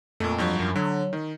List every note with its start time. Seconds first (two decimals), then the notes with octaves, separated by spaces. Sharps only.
0.20 F2 A#2 A3
0.38 G2 F3 F#3
0.60 F#2
0.76 D3 F#3
1.13 D#3